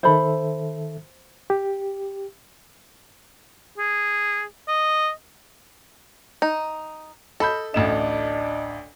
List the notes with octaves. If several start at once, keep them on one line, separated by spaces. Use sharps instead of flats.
D#3 A4 C5 E5 B5
G4
G#4
D#5
D#4
A4 D#5 B5 G6
A1 D2 D4 D#5 E7